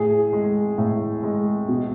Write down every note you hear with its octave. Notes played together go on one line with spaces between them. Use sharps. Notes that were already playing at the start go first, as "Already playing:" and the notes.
Already playing: A2 G#4
G#3
A2
G#3
B2